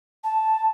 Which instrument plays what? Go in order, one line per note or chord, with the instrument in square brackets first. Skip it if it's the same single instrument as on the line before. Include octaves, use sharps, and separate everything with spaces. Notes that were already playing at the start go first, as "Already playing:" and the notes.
[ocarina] A5